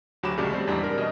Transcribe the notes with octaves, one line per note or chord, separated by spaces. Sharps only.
D2 F#3 G4 B5 D6 E7
A#1 C#3 G#3 A3 G4 D5
G3 C4
E2 G#2 G3 D4
D4 A#4
B2 D#5